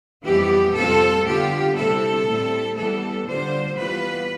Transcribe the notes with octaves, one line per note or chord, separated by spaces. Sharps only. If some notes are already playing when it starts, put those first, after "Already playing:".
F2 E3 G3 B3 E4 G4
F2 C3 G3 C4 F4 A4
D3 G3 B3 F4 G4
C3 G3 C4 E4 A4
A2 G3 C4 E4
E3 G3 B3 A4
D3 G3 D4 F4 C5
E3 G3 B3 F4 B4